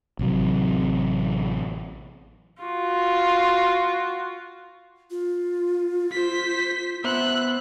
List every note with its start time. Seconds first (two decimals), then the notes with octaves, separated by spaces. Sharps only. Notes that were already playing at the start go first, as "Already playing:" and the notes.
0.19 A1 C3 F#3
2.62 F4 F#4
5.11 F4
6.12 C5 B6
7.04 B3 C5 E5 E6 F#6